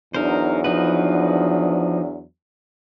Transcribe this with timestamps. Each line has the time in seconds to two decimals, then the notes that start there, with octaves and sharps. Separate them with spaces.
0.15 E2 F#3 D4 D#4 A#4 C5
0.64 F3 D#4 B4